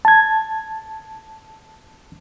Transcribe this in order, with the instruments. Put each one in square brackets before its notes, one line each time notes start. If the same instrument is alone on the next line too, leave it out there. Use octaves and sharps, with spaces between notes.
[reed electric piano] A5 G#6